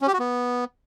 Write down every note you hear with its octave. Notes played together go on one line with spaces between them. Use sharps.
C#4
G4
F#4
B3